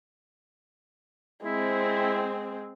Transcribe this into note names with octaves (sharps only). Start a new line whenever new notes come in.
G#3 C4 E4